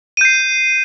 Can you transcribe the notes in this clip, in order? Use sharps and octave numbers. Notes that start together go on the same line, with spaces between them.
G6 C7 D#7